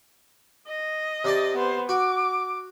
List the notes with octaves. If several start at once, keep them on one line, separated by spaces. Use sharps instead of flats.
D#5
C3 D5 A5
B3 C5
F#4 D6